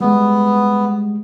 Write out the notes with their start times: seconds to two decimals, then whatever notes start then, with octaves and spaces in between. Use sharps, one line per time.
0.01 G3 G#3 B3